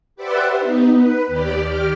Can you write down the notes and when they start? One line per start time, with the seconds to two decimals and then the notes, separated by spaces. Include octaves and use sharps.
0.16 G4 B4 C5 D5 E5 F#5
0.59 B3 D#4
0.94 B4
1.28 D#2 G4 D5
1.64 D#3 G4 D6 F6